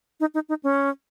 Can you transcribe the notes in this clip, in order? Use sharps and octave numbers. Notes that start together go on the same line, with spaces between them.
D#4
D#4
D#4
C#4